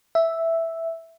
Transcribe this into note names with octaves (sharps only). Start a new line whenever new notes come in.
E5